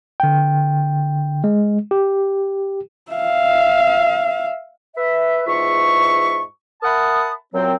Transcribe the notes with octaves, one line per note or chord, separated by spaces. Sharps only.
D3 G5
G#3
G4
E5 F5
B4 E5
E2 G#2 F4 E5 C#6
A#4 E5 F#5 A5 B5 D#6
F#2 A#2 F#3 C4